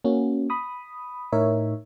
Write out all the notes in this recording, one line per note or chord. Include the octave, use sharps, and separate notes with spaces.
A#3 C#4 F#4
B5 D#6
A2 D#4 A#4 C#5 E5